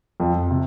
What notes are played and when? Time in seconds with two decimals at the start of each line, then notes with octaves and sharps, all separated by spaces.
0.20 F2
0.51 C3